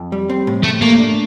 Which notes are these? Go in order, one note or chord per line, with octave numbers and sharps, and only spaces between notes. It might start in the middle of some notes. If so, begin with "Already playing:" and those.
Already playing: F2
G3
C4
A2
A2 A3
A3 A#3
D4